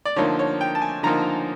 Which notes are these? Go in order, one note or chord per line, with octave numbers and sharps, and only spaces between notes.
D5
D3 F3 A#3 D#4 C#5
C#5
G5
A5
G#5
D3 F3 A#3 D#4 A#5